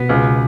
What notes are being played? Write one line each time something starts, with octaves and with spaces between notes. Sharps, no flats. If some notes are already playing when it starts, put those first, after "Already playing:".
Already playing: B2 B3
C#2 C#3